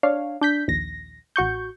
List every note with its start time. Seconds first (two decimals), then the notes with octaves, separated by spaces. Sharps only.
0.03 D4 C#5 F5
0.41 D4 G6 B6
0.68 A#1 D#2 A#6
1.36 A1 F#4 C#6 G6